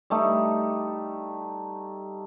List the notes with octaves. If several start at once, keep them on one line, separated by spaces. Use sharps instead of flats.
G3 A3 D#4